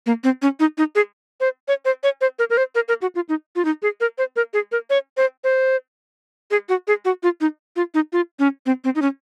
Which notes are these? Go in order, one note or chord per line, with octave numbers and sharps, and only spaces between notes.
A#3
C4
C#4
D#4
D#4
G#4
C5
C#5
C5
C#5
C5
A#4
A#4
C5
A#4
A#4
F#4
F4
D#4
F4
D#4
G#4
A#4
C5
A#4
G#4
A#4
C#5
C5
C5
G#4
F#4
G#4
F#4
F4
D#4
F4
D#4
F4
C#4
C4
C4
D#4
C#4